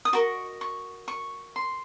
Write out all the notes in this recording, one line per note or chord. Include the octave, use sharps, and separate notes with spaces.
D#6
F#4 A#4 D#5 C#6
C#6
C#6
C6